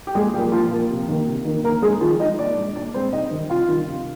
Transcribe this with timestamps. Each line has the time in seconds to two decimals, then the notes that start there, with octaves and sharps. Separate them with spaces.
0.07 G4
0.15 A#2 G#3 G#4
0.34 F3 G3 A#3 G4
0.52 A#2 F3 F4
0.71 F3 A#3
0.90 C3
1.08 D#3 A#3
1.27 C3
1.45 D#3 A#3
1.64 D#3 A#3 A#4
1.82 G#3 G#4
2.01 D#3 F3 F4
2.19 G#3 D#4 D#5
2.39 A#2 D4 D5
2.58 G#3
2.76 A#2 D4 D5
2.94 G#3 C4 C5
3.12 C3 D#4 D#5
3.31 D#3 G3
3.50 C3 F4 F5
3.68 D#3 G3
3.87 C3